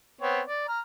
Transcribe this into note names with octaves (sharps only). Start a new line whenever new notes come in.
B3 C4 C#5
D5
A#5 F6